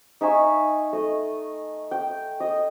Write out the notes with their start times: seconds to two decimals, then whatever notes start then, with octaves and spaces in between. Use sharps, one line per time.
0.21 D#4 E5 G#5 C#6
0.93 A3 D#5
1.91 G5
2.40 D#5